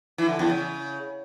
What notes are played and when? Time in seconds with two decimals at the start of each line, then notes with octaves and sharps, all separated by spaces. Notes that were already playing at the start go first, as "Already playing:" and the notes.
0.18 E3
0.29 D3
0.39 E2
0.50 C#3